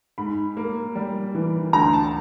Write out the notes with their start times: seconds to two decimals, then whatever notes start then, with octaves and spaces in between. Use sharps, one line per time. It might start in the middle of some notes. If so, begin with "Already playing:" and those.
0.18 G#2 B5
0.57 A#3
0.95 G3
1.35 E3
1.73 D2 A#5
1.93 A5